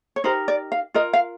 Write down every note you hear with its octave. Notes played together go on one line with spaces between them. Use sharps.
C#5
D#4 G4 A#4 C5
D5
F5
F4 A#4 D#5
F5